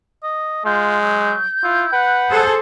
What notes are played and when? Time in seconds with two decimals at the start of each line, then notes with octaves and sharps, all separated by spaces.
0.23 D#5
0.66 G#3 F4 G6
1.01 F#3
1.64 E4 F4
1.93 B4 F#5
2.30 G#4 A4 C5